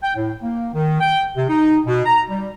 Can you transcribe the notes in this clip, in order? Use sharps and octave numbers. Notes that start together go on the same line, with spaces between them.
G5
A2
A#3
D#3
G5
C3
D#4
B2
A#5
G3